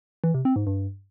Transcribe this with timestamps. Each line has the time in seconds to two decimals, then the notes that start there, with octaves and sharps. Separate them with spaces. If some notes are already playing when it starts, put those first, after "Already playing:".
0.24 E3
0.34 C3
0.45 C4
0.56 G#2
0.67 G2